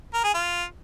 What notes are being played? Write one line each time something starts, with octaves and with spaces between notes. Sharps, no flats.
A#4
G#4
F4